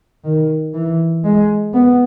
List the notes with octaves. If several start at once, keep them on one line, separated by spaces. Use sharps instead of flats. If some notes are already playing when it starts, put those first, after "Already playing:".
D#3
E3
G#3
B3